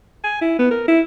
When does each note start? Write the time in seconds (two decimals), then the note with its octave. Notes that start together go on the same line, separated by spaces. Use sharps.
0.24 G#5
0.41 E4
0.59 B3
0.71 A#4
0.88 E4